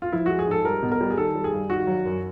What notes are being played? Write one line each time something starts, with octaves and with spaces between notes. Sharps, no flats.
F4
F3 E4
G#3 F#4
G#4
G#2 A4
G3 A#4
B2
A#4
G3
G#4
D#3 A4
G3
G#4
G2
D#3 F#4
F#3
F#2